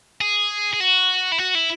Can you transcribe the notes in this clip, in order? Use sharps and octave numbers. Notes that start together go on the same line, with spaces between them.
G#4
G#4
F#4
E4
F#4
E4